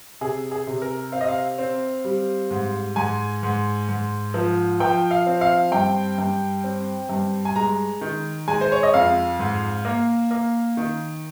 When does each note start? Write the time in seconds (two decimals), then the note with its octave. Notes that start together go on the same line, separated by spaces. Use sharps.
0.21 C3 G#4
0.51 G#4
0.67 C3
0.82 A#4
1.12 C4 F5
1.21 D#5
1.28 F5
1.58 C4
2.05 G3
2.51 G#2
2.96 G#2 G#5
3.43 G#2
3.88 G#2
4.34 F3
4.80 F3 G5
5.11 F5
5.26 C4
5.41 F5
5.72 G2 G5
6.18 G2
6.64 C4
7.09 G2
7.45 G#5
7.56 G#3 A#5
8.01 D#3
8.48 G#3 G#5
8.61 C5
8.72 C#5
8.83 D#5
8.94 F2 F5
9.39 G#2
9.85 A#3
10.31 A#3
10.77 D#3